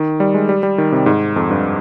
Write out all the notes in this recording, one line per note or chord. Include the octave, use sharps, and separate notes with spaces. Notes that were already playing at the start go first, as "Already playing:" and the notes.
Already playing: D#3
G3
G#3
G3
G3
D#3
C3
G#2
F2
G2